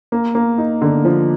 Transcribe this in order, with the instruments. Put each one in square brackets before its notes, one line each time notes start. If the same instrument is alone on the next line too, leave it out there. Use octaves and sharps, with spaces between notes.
[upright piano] A#3
A#3
D#4
D3
F3